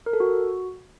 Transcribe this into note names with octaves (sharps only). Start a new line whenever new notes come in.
A#4
A4
F#4